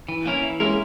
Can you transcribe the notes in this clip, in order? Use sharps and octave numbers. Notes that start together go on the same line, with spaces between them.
E3
A#3 C#4 E4 A#4
E3
G#3 A#3 C#4 E4 A#4